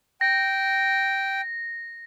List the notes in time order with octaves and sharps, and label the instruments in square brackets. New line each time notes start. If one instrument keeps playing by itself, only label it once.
[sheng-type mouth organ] G5 [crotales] A#6